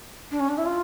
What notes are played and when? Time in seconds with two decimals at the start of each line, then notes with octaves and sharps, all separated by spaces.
0.31 D4
0.40 C#4
0.49 D4
0.58 E4
0.66 F4